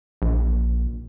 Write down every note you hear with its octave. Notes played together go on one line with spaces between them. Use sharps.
A#1